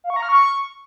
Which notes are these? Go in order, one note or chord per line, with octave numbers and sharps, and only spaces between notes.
F5
C#6
A#5
F6
C#6